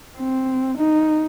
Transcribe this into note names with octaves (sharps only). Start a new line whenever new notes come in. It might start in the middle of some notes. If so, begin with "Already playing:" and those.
C4
D#4